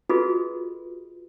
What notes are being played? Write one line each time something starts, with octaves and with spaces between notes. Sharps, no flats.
F4 F#4 G#4 A4 B4 D#5